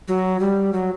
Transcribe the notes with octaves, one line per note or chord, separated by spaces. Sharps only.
F#3
G3
F#3